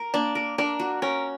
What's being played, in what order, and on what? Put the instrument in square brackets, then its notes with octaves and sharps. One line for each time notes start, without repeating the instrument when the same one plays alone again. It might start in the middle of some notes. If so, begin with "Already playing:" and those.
Already playing: [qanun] A#4
[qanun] A#3 [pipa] D4
[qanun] A#4
[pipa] D4 [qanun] A#4
[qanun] F#4
[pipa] C#4 [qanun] A#4